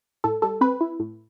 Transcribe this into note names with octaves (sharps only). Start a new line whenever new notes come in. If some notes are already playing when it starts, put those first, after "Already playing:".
A2 A4
G3 A4
C4 B4
E4
A2